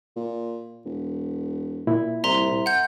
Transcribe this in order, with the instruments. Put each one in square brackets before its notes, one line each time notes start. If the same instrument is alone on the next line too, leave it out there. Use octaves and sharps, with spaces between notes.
[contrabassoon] A#2
E1
[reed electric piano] A#2 E4
[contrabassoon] C2 [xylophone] E5 A#5 C6
[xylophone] F#5 G6